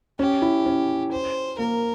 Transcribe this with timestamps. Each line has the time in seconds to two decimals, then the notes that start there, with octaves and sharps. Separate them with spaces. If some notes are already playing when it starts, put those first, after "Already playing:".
0.19 C#4 G4
0.42 E4
0.66 C#4
1.12 C5
1.58 A#3 A#4